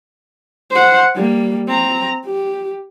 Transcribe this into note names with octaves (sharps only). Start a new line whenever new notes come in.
C5 F#5
G3 A#3
C4 A#5
G4